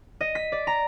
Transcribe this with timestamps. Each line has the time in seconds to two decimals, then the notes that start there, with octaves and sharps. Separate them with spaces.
0.21 D#5
0.35 B6
0.52 D5
0.67 A#5